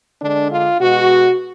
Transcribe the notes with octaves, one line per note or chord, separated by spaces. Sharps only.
D3 G#3 D4
F4
B2 G#3 F#4